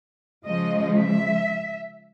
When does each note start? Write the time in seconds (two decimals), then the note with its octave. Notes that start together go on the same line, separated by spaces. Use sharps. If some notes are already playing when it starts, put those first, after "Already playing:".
0.45 C#3 F3 G#3 D#5
0.98 E5